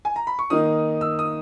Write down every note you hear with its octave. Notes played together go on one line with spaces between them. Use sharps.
G#5
A#5
B5
C#6
D#3 A#3 D#4 D#6
E6
D#6